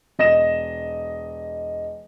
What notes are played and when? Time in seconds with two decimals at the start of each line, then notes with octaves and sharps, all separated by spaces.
0.19 E1 D#5 A#6 E7